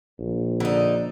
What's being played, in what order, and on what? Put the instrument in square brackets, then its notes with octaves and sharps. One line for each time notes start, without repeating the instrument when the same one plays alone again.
[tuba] A#1
[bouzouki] D3 D#4